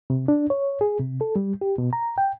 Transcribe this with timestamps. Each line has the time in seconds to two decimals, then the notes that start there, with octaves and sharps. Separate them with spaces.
0.10 C3
0.28 D4
0.50 C#5
0.81 G#4
0.99 C3
1.21 A4
1.36 G3
1.61 G4
1.78 B2
1.93 A#5
2.18 G5